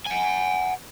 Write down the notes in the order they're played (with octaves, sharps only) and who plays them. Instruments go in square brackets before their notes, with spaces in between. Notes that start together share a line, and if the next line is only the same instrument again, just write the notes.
[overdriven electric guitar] F#5 G#5